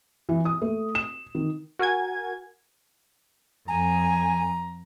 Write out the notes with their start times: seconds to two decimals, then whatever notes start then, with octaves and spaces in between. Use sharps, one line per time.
0.29 E3
0.45 D#6
0.62 A3
0.95 E7
1.35 D#3
1.79 F#4 A#4 F#5 G#5 G#6
3.68 F2 G#5 A#5